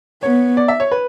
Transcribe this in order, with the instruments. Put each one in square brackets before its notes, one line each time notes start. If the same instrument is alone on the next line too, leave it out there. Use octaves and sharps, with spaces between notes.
[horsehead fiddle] B3 [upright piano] C#5
[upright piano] D5
E5
C#5
B4